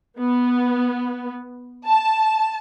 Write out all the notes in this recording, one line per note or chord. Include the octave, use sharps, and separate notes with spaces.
B3
A5